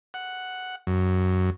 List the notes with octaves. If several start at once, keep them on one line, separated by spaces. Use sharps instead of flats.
F#5
F#2